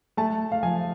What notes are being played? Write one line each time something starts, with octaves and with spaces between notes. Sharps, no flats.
A3 A5
F5
F3 G#5